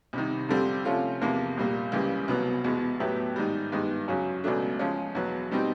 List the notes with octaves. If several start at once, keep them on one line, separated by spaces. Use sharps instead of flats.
C2 C3 D#3
F2 D3 G3 C4
C3 F3 A3 C#4 F4
E2 C3 F3 A#3
A#1 A#2 G3 A#3
C#2 C#3 E3 G3 A#3
C2 B2 F#3 B3
E2 B2 G#3 B3
A2 F#3 B3 E4 G4
G#2 D#3 G3
G2 D#3 G#3 B3
F#2 C#3 F#3
C#2 B2 F#3 A3 D4
C#3 F3 G#3 C#4
E2 B2 F#3
B2 G3 C4 D#4